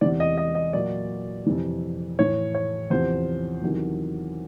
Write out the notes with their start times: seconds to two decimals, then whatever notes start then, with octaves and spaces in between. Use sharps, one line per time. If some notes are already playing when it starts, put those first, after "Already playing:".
0.01 E2 C3 E3 D5
0.20 D#5
0.38 D#5
0.55 D#5
0.73 A#2 F#3 D5
1.46 F2 C3 E3
2.19 A2 E3 C#5
2.55 C#5
2.90 E2 C3 F3 C5
3.62 E2 C3 D#3 F#3